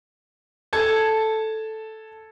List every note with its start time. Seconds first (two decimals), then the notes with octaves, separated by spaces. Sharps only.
0.73 A4 A5 G#6